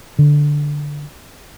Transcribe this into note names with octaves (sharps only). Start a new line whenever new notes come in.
D3